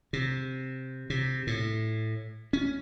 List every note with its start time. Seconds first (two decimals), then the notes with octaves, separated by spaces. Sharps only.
0.13 C3
1.10 C3
1.47 A2
2.53 C#4